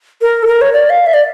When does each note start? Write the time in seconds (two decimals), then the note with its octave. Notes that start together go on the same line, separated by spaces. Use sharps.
0.22 A#4
0.43 A4
0.47 A#4
0.61 C#5
0.73 D5
0.90 F5
1.06 E5
1.14 D5